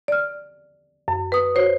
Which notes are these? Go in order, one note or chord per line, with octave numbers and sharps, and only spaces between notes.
D5 F6
F#2
B4 D#6
F#4 C5 C#5